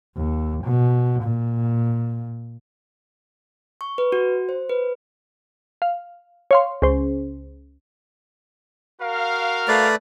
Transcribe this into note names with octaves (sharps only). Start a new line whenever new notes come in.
D#2
B2
A#2
C#6
B4
F#4
C5
B4
F5
C#5 F5 C6
C#2 C5
F#4 A#4 F5
A3 B4 D5